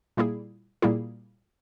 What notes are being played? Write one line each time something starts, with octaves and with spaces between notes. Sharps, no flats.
A#2 G3 A#3 E4 G#4
A#2 G3 A#3 E4 G#4